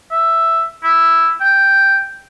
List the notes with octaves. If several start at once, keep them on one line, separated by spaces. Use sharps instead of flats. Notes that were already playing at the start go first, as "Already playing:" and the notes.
E5
E4
G5